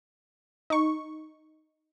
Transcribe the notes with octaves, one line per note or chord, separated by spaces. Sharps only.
D#4 C#6